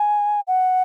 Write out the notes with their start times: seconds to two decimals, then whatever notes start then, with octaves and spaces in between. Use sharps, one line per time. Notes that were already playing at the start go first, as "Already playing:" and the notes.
Already playing: G#5
0.48 F#5